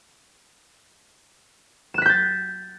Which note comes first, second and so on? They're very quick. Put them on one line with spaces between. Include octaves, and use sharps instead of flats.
E7 F#6 B6 G6 A6